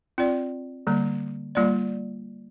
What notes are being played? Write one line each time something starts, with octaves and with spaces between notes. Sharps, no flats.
C4 F4 D5
D3 G3 A#3
G3 A#3 F4 D5